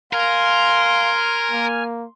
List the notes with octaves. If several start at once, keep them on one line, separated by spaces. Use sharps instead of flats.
A#4 F5 G#5 C6 F6
A#3